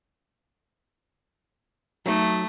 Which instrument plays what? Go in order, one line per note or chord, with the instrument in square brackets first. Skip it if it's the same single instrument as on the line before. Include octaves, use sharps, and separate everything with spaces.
[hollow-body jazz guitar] F#3 D#4 [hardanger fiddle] A3